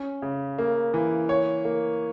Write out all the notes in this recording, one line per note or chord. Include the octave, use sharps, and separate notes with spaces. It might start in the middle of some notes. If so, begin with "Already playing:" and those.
Already playing: C#4
C#3
A#3
E3
C#5
A#3